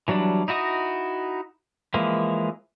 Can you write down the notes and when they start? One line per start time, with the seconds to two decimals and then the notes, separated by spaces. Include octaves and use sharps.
0.08 E3 F#3 G3 D4
0.48 D#4 E4 F#4 D#5 D#6
1.94 E3 F3 G#3 A#3 E4